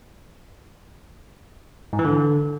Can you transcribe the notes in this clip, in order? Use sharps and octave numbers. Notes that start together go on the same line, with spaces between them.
G#2
E3
D3